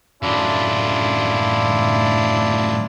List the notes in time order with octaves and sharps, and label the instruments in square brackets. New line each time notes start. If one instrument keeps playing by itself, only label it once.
[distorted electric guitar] F#2 A2 [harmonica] D4 E4 F4